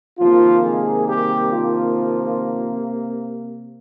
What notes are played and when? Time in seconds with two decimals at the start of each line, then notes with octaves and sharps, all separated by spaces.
0.19 C3 D#3 F3 A#3 F4
0.63 G#3 G#4
1.07 G3 G4
1.52 F3 F4